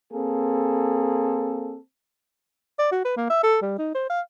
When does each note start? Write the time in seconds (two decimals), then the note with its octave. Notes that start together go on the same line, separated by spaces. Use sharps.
0.12 A#3 C4 G#4 A4
2.79 D5
2.92 F#4
3.05 B4
3.17 A#3
3.30 E5
3.43 A4
3.61 G3
3.78 D#4
3.95 C5
4.10 F5